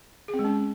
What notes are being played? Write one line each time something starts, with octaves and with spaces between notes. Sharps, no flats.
G#4
C4
G#3
C#4